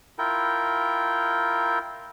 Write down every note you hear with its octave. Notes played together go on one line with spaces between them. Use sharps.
E4 F4 A#4 G5